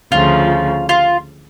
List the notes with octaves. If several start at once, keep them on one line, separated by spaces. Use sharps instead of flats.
D2 C#3 F3 F4
F4